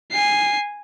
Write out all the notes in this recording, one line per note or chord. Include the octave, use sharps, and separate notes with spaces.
G#5 C7